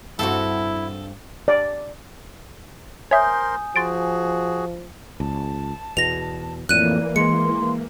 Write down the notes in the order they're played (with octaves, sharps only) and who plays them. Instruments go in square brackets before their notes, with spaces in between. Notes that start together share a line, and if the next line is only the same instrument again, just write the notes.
[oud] G2 C4 F#4 [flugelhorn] E4 [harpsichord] A4
[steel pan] D5
[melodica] A#4 C5 C6 [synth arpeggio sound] C#5 E5 [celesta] G#5 D#6 G6
[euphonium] F3 [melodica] F#4 G#4 [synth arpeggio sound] C6 A6 D7
[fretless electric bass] C#2 [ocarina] A5
[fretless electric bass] E2 B2 [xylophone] A#6 F7
[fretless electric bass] F2 A2 [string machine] E3 A#3 [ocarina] D5 [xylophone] F#6 D#7
[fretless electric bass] G#3 [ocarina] C6 [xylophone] C#7